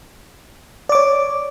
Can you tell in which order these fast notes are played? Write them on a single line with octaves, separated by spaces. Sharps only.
D5 D6 C#5